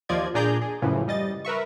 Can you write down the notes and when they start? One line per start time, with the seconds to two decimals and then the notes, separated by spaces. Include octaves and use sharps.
0.09 D#2 F3 F4 D5 D#5 G#6
0.34 A#2 D4 G#4 D5 A#5 G6
0.62 G#4
0.82 F#2 A2 C#3 E3 F3
1.08 G3 D#5 A6
1.45 A#4 B4 E5 C#6